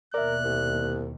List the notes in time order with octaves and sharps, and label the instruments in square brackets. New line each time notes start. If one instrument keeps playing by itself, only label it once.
[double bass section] D#2 B2 [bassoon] A#4 [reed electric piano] D5 E5 [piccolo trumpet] F#6
[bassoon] C2